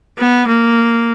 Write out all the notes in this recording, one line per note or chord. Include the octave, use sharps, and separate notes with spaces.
B3
A#3